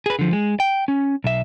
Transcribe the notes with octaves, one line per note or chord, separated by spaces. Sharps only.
G#4 B4
D3 F3
G#3
G5
C#4
B1 E5